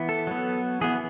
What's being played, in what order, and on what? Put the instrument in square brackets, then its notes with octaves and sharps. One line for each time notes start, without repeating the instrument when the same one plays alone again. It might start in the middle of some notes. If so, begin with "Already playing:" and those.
Already playing: [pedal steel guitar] E3 B3
A4
F#3 B3
E3 B3 G#4